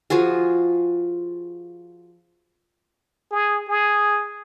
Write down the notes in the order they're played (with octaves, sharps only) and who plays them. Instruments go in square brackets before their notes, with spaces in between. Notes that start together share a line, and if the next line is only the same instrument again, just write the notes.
[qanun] F3 F4 F#4 G#4
[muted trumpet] G#4
G#4